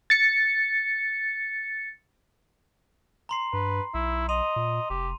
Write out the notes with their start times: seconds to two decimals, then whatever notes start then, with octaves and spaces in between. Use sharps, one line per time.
0.10 A6 C#7
3.29 A#5 C6 C7
3.53 G2 B4
3.94 B1 E4
4.29 D#5 C6 D#7 F7
4.56 A#2
4.90 F1 G4